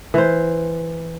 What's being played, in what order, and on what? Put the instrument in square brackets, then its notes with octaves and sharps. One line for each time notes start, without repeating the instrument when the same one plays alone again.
[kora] E3 C5